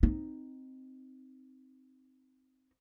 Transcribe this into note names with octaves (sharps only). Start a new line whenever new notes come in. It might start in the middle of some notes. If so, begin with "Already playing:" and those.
C4 D#4